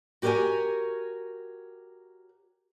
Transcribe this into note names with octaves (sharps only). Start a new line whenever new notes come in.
F#4 G4 A#4 B4 C#5 G#5